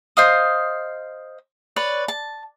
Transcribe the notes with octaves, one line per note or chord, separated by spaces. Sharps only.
C5 D#5 F5 D#6
B4 C#5 D5
A5